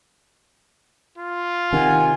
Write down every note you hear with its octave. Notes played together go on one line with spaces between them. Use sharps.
F4
C3 D#3 F#5 G#5